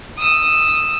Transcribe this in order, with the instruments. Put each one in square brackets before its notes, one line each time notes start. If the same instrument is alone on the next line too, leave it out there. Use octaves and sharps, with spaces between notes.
[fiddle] D#6 E6